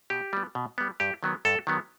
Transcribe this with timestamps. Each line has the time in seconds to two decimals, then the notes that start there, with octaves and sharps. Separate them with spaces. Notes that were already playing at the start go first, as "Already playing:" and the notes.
0.10 B2 G4
0.33 G3 B3
0.55 B2
0.78 G3 B3
1.00 G2 G4
1.23 D#3 F#3 B3
1.45 G2 A4
1.67 D#3 F#3 B3